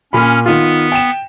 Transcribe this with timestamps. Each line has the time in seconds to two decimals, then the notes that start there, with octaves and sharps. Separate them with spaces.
0.13 A#2 C#4 B5 F6
0.46 D#3 B3 F4
0.92 G5 E7